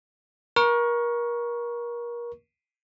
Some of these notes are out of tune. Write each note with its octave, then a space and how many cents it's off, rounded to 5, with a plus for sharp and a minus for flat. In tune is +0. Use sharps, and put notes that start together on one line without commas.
A#4 +30 C#6 +0